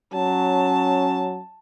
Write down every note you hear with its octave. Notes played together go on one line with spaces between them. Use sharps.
F#3 C#4 A5